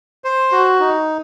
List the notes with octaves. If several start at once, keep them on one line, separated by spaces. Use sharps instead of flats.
C5
F#4
D#4